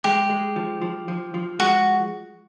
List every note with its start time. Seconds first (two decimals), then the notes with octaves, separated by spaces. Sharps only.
0.04 G#3 G4
0.30 G#3
0.56 F3
0.81 F3
1.08 F3
1.34 F3
1.59 G#3 F#4